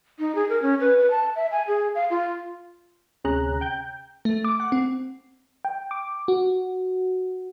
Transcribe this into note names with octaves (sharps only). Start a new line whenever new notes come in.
D#4
G#4
A#4
C#4
B4
B4
A5
E5
G#5
G#4
F5
F4
D2 C3 C#4 G#4 A#5 F#6
G5 G6
A3
D6
F#5
C4
G5
D6
F#4